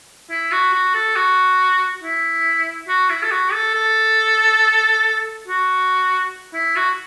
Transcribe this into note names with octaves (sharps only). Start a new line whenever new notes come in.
E4
F#4
F#4
A4
F#4
E4
F#4
E4
A4
F#4
A4
A4
F#4
E4
F#4